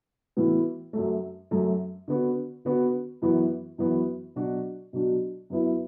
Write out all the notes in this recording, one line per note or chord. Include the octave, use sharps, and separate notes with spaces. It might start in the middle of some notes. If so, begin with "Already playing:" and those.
A2 E3 B3 F#4
F#2 F#3 A3
F#2 F#3 A3
D3 B3 F#4
D3 B3 F#4
F#2 E3 B3 F#4
F#2 E3 B3 F#4
B2 F#3 D4 F#4
B2 F#3 D4 F#4
F#2 F#3 B3 E4